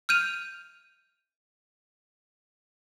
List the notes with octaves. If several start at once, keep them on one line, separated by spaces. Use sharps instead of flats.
F6 G6 D#7 F7